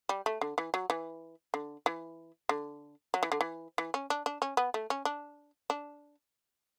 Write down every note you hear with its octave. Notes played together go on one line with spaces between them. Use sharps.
G3
A3
D3
E3
F#3
E3
D3
E3
D3
F#3
E3
D3
E3
E3
C#4
D4
D4
C#4
B3
A3
C#4
D4
D4